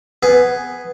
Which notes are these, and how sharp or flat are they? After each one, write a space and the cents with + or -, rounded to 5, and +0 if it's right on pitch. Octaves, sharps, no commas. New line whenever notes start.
B3 +5 G#4 +0